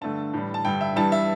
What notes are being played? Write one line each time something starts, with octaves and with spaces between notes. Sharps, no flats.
G2 D3 A3 A5
A2 E3 G3
A5
G2 D3 G3 G5
E5
G2 E3 G3 A5
E5